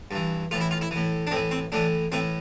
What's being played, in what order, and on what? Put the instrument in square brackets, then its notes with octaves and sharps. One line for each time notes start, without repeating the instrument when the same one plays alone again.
[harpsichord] G2 E3
A2 E3 F4
E4
F4
E4
A2 E3
D4
A2 C4
E3
C4
A2 E3 D4
A2 E3 C4